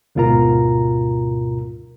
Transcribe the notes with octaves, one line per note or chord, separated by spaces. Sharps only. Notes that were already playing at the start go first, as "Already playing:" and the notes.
D2 G#2 B2 F4 A#4 A#5